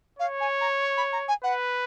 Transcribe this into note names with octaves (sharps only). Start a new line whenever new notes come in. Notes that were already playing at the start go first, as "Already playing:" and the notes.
C#5 F5
G#5
A#5
C#6
B5
A#5
G#5
B4 F#5